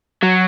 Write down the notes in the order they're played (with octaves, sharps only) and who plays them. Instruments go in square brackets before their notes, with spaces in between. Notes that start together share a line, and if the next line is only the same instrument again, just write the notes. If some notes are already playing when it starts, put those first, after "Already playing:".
[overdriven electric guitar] F#3